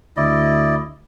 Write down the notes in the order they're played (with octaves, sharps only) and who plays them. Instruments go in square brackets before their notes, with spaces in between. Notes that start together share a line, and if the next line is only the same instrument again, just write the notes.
[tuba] D2 [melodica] E4 D5 D#5